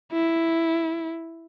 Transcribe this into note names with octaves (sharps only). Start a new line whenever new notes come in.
E4